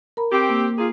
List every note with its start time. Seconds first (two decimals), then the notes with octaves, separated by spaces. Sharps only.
0.17 A#4 A#5 B5
0.32 C4 G4
0.50 A#3
0.78 F4 G#4 A#5